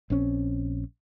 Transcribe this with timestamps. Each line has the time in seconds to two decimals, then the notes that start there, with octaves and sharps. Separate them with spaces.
0.10 A#1 C4 C#4